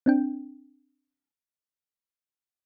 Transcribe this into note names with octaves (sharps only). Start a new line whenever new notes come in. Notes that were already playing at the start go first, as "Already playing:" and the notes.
C4 D4 G5